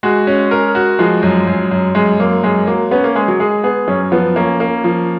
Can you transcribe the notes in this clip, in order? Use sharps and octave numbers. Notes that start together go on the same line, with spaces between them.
G#3 F#4
C#4
A#4
F#4
F3 G#3
F#2
F#2
F#2
F#2 G#3
F#2 A#3
F#2 G#3
F#3 A#3
B3 C#4
A#3
G#3 G#4
F#3
G#3 G#4
B3 G#4
F#2 C#4
F3 B3
A#3 C#4
A#3
F3